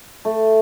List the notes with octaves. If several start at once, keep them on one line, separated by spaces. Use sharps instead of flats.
A3